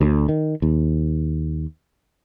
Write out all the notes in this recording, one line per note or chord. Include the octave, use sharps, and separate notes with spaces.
D2
D#3
D#2